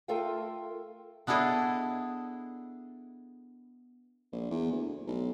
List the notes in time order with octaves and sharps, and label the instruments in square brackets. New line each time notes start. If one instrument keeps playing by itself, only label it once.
[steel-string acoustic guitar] A3 F4 A4 A#4 F5 G5
[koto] B3 D4 E4 G#4 A4 D#5
[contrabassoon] A#1
E2
D2
B1